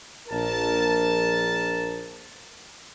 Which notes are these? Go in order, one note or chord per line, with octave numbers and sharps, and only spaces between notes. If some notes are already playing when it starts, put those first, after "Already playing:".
A#1 A#4 A5